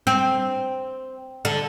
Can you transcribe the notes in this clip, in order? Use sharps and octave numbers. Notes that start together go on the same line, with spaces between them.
C4
D3